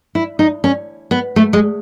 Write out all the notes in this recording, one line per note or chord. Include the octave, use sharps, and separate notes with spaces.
E4
D#4
C#4
B3
A3
G#3